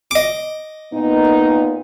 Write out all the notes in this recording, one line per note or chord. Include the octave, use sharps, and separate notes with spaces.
D#5 D6
A#2 B3 D#4